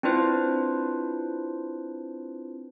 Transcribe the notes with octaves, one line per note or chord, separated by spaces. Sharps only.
C4 D4 E4 F4 B4 C5